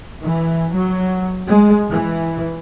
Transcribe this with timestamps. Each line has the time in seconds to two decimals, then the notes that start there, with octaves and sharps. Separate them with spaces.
0.23 E3
0.74 F#3
1.47 G#3
1.90 E3